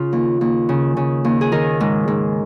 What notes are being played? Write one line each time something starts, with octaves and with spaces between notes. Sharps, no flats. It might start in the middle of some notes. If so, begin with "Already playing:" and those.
Already playing: C#3 F4
D#2
D#2
C#3
C#3
D#2
G#4
D#3 A#4
G#2
G#2